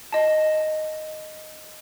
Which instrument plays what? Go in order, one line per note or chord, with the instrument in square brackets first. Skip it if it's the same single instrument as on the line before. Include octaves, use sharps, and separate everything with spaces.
[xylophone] D#5 A5